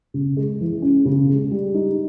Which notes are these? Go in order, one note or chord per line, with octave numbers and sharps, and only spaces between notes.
C#3
G#3
E3
C#4
C#3
G#3
G3
D#4